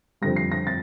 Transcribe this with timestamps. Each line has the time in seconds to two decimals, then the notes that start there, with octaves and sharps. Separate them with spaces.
0.21 F2 D3 G3 A#6
0.36 C7
0.52 A#6
0.67 A6